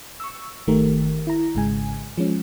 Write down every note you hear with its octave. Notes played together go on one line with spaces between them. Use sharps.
C#6 E6
G1 D#3 A3 G4 A#4
E4 A#5
G#1 G#2 C#3 G#3 G#5
F3 G#3 C#4